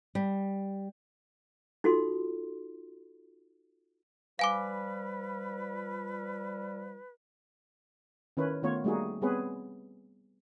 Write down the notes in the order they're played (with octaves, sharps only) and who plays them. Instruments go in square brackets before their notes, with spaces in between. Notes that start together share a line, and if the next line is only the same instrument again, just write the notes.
[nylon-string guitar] G3
[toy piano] D#4 F4 F#4 A4 C6
[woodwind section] F3 G3 [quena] B4 [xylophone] F5 G#5 D6
[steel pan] D#3 C#4 E4 A#4 B4 C#5
D#3 A3 B3 F4 C#5
G3 A3 A#3 D#4 F#4 G#4
G3 B3 C4 G#4 B4 C#5